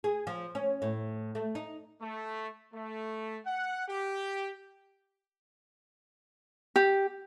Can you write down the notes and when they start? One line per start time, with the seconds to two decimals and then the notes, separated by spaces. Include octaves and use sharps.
0.04 G#4
0.27 F3
0.55 C#4
0.82 A2
1.35 A3
1.55 D#4
2.01 A3
2.74 A3
3.46 F#5
3.89 G4
6.76 G4